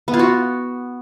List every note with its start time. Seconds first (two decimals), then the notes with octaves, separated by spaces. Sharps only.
0.08 B3
0.14 F4
0.19 F#4